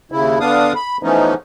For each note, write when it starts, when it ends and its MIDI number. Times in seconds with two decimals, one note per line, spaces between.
0.12 0.39 39
0.12 0.39 49
0.12 0.39 64
0.40 0.73 50
0.40 0.73 59
0.40 0.73 62
0.40 0.73 77
0.40 0.73 87
0.75 0.98 83
1.03 1.34 52
1.03 1.34 53
1.03 1.34 57
1.03 1.34 59
1.03 1.34 61
1.03 1.34 63